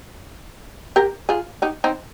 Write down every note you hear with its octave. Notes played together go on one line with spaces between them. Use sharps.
G4 A#4
F4 G#4
D#4 G4
C4 D#4